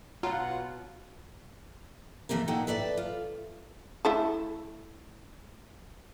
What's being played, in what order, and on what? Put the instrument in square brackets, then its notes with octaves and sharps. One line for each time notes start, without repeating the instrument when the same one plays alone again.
[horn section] B2 F#5 [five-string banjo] F#3 [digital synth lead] F4 [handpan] F#4
[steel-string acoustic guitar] E3 A3 A#3 A4 A#4
A#2 A3 D#4 A4 F#5 G5
A4 B4 D5 E5
F4
[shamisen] A3 E4 A4